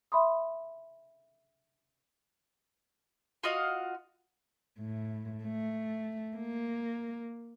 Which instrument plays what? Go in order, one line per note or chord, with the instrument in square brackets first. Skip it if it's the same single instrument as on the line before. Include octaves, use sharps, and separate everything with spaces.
[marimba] E5 B5 C6 D#6
[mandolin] F4 F#4 D#5 F5
[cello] A2
A3
A#3